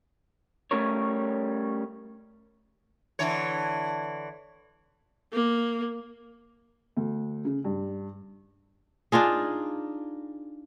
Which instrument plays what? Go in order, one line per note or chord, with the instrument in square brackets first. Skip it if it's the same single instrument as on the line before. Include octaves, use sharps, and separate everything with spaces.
[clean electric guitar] G3 A3 C#4 A#4 C#5
[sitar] D3 E3 C#5
[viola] A#3
[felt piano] D2
C#3
G2
[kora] D4 D#4 F4 G#4